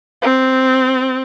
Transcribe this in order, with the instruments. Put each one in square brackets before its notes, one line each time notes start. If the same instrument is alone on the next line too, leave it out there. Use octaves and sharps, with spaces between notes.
[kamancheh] C4